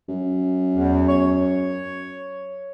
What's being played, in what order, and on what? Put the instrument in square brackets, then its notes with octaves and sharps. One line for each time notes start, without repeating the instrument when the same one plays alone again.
[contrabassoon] F#2
[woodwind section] E2
C#5